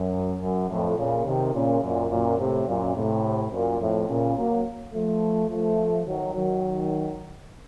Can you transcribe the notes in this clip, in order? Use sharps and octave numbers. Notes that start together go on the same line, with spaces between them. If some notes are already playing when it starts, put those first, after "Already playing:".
Already playing: F#2
F#2
F2 A2
A#2 C#3
C3 D#3
A#2 C#3
F#2 A#2
F#2 A#2
A2 C3
F#2 A#2
A2 C3
F#2 A#2
F2 A2
A#2 C#3
F#3 A#3
F3 A3
F3 A3
D#3 F#3
D#3 F#3